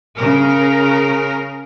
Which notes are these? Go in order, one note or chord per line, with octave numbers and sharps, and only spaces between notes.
C#3 A#4